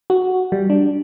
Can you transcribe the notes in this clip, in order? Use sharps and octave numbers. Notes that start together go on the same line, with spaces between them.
F#4
G3
D4